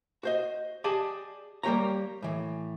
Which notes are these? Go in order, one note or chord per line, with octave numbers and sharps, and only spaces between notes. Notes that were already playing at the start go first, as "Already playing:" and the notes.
F#4 C5 D#5
G4 G#4 D5 D#5 G#5 A5
G3 A#3 G4 C#5 A#5
A2 E3